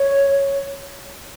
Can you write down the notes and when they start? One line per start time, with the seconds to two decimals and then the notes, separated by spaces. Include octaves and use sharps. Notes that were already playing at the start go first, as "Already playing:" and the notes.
Already playing: C#5